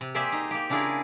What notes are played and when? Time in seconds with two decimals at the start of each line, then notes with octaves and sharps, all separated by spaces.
0.01 C3
0.14 A#3 G4 G#4 C5 D5 E5
0.32 D#4
0.51 A#3 G4
0.70 C#3 D4 E4 F4 G#4 A#4